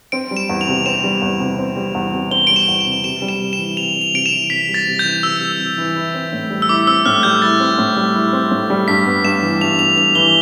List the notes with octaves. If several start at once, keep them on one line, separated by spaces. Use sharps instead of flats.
C4 D7
G3
E7
E2
F7
C3
C4 E7
G3
E2
C3
C4
G3
E2
C3
C4 G7
G3 D7
E7
E2
E7
C3
C3 E7
G3
E7
C3
E7
E3
C3 F7
G3
F7
C3 D7
E7
E3
C3 B6
G3
A6
C3
G6
E3
C3 E6
G3
C3
E3
E4
C4
A2
G3
E6
E4 D6
C4 E6
A2 F6
G3 G6
E4 A6
C4
A2
G3
E4
C4
A2
G3
G2 B6
B3
G2 E7
E3
G2 F7
B3 F7
G2 F7
E3 G7